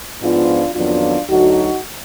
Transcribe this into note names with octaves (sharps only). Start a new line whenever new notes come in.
G#2 F3 B3 D4 F4
F2 D#3 F#3 B3 D4 F4
D2 D3 F#3 D#4 F#4